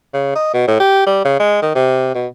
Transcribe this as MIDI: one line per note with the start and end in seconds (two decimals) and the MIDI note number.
0.13 0.31 49
0.35 0.51 75
0.53 0.67 47
0.67 0.77 45
0.80 1.02 67
1.06 1.21 55
1.24 1.37 49
1.40 1.61 56
1.62 1.73 51
1.75 2.13 48
2.14 2.27 47